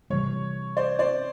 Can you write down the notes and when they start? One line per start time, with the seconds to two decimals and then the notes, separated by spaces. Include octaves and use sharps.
0.10 C3 E3 G3 C#5
0.77 C5 D5
0.99 C5 D5